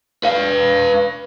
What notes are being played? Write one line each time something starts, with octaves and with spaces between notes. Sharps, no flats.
B4 F5